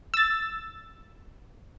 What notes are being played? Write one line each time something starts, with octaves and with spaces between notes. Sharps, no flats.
E6 A6